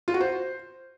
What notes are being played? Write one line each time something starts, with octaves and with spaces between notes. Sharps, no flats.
F4
F#4
C5